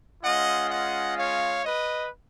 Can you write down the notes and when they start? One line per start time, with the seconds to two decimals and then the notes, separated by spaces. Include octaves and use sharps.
0.23 G#3 C#4 F4 D#5 F#5
0.70 D#5 F#5
1.18 C#5 F5
1.64 B4 D#5